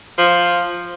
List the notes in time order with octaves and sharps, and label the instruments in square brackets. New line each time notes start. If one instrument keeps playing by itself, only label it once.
[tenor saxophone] F3